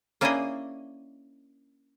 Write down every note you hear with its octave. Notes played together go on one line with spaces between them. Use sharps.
A#3 C#4 D4 E4 G#4 D#5